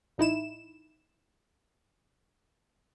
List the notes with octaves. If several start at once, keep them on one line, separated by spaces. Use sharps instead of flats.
A1 D#4 E4 E7